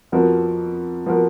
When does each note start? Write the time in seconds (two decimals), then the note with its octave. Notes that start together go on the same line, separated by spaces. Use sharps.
0.12 F2 F3 B3 F#4 A#4
1.06 F3 B3 F#4 A#4